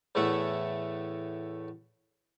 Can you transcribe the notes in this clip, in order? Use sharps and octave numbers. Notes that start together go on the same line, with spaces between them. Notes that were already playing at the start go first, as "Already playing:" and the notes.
E2 A2 A3 E5 F#5